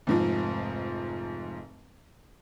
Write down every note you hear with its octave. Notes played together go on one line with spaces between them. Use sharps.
F1 G#2 F3